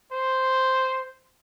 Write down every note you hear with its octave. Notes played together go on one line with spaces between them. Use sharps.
C5